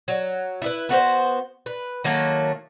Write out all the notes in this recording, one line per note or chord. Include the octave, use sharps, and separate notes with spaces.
F#3
E4 G#4 B4
B3 F#4 A#4 C5
B4
D#3 F#3 A3 A#3